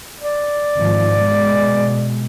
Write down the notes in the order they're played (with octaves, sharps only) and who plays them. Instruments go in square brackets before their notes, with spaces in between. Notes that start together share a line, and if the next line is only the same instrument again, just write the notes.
[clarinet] D5
[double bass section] G#1 F3
B2 G#3